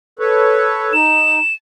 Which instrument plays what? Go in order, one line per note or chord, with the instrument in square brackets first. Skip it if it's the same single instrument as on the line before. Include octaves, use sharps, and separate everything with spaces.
[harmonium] A4 B4 C#5
[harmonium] D#4 [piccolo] E7